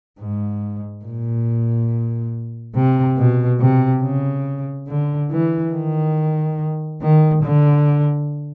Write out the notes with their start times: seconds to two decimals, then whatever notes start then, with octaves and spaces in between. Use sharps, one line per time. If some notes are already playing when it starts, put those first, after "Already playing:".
0.19 G#2
1.04 A#2
2.75 C3
3.17 B2
3.60 C3
4.02 C#3
4.88 D3
5.31 E3
5.73 D#3
7.01 D#3
7.43 D3